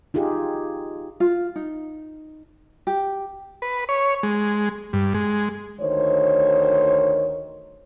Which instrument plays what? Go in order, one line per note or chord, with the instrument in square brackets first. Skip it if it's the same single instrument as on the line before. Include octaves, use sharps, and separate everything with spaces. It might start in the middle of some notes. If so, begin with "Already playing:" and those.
[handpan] D#4 F4 G4 G#4
[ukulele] F4
D#4
G4
[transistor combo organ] B4
C#5
G#3
G2
G#3
[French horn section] D2 D#3 C5 C#5